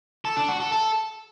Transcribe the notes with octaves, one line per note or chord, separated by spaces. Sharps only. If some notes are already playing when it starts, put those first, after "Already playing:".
A4
D4
F#4
A4
A4